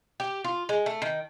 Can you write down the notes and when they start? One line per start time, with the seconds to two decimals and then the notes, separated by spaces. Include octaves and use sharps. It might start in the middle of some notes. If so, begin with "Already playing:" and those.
0.20 G4
0.44 F4
0.69 G#3
0.86 A3
1.02 D#3